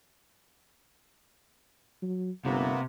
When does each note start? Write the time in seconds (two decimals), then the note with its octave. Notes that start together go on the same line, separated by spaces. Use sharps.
2.02 F#3
2.45 G1 C3 A#3 B3